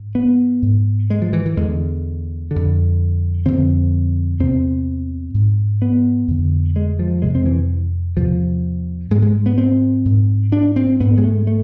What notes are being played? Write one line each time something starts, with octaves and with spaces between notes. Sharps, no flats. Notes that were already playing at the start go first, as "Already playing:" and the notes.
Already playing: G#2
B3
G#2
G#3
F3
E3
E3
E2 D3 G#3
F2 D3
F2 D3 C4
E2 C3 C4
G#2
B3
F2 D3
G#3
F3
F2 C3 G#3
C4
E3
E2 C3 F3
G#2 G#3
G#3
B3
C4
G#2
D4
C4
G#2 B3
G#3
A3
A3